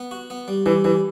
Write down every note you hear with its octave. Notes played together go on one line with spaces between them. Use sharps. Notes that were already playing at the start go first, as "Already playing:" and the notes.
Already playing: B3
F#4
B3
G3
E3 G3
E3 G3